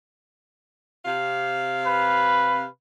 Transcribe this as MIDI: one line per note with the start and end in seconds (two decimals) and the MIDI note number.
1.05 2.64 48
1.05 2.64 77
1.86 2.69 71